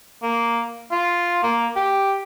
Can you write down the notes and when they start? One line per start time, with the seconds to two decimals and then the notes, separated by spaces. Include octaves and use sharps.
0.22 A#3
0.92 F4
1.43 A#3
1.76 G4